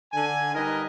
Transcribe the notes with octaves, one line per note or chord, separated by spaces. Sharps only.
D3 G#5
G3 D#4 A#4 B4 D#5